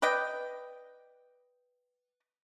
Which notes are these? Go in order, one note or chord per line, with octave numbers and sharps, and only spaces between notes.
B4 D5 D#5 G5